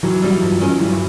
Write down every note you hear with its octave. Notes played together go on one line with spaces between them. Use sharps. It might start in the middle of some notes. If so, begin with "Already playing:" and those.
D#3 E3 F#3
G3 B3 D#4
G2 F3
D#3 G#3 C#4
G2 E3 F#3